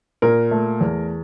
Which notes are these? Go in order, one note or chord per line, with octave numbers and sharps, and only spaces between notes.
A#2 A#4
A3
E2